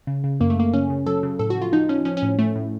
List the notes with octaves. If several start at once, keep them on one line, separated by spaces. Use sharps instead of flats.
C#3
C#3
F#2 A#3
A3
F#2 A#3
C#3 C#4
C#3
F#3 A4
C#3
A2 A4
F#4
F3
F4
F3 D#4
F3 C#4
F3 C#4
C#4
A2
A2 A3
A2